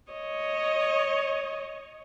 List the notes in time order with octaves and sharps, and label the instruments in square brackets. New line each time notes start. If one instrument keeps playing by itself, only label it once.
[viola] C#5 D#5